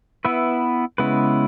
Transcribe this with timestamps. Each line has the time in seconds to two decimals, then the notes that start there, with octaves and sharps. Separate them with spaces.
0.25 B3 E4 B4 E5
0.98 C#3 G#3 B3 E4 B4